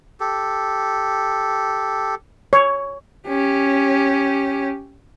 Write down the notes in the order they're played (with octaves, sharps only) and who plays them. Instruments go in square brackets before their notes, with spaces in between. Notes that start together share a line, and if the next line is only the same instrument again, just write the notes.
[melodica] G4 A4
[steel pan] C#5
[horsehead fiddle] C#4 G4